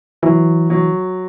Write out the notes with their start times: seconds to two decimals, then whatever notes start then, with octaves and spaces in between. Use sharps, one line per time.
0.22 E3 F#3
0.70 F#3